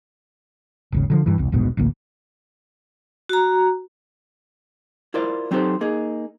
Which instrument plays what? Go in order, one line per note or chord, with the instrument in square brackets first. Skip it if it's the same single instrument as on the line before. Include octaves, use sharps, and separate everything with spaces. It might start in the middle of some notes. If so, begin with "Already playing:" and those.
[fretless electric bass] D#1 G#1 C#3
D3 D#3 F3
G2 E3
E1 C2
D#1 A#1 G#2 B2
A1 D2 A3 A#3
[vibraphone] F#4 A#5
[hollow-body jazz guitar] E4 F4 A#4 C5 D5 F5
F#3 C4 D#4 G4 A4 C5
A#3 D#4 G#4